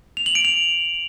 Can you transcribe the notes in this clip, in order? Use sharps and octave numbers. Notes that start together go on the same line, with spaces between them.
F7
F#7
D7
F7